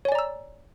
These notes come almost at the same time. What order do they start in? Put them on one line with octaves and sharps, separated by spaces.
C#5 G#5 D5 A#5 E6